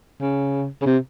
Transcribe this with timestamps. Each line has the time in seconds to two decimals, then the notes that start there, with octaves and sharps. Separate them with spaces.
0.21 C#3
0.81 C#3
0.86 C3